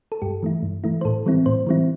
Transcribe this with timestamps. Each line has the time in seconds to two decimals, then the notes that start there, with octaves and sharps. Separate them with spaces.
0.12 A4
0.22 G2 G4
0.43 E3 A3 E4
0.63 G2
0.84 E3 A3 E4
1.01 C5
1.05 A2 A4
1.26 E3 G3 C4 E4
1.46 A2 C5
1.67 E3 G3 C4 E4